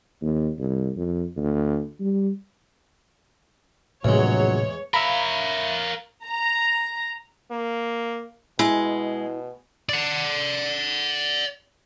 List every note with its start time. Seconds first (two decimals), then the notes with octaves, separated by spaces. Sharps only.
0.21 D#2
0.59 C2
0.97 F2
1.37 D2
2.00 G3
4.05 A#1 E2 A2 C3 F#3 G#3 C#5
4.94 A#4 C#5 E5 F5 A#5 B5
6.27 A#5
7.51 A#3
8.59 B2 G#3 E4
9.89 D5 F#5